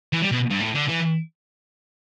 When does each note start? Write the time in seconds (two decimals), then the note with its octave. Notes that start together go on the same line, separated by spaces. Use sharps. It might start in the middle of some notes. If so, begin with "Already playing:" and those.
0.13 E3
0.22 G3
0.32 B2
0.50 G2
0.60 A2
0.74 D3
0.88 E3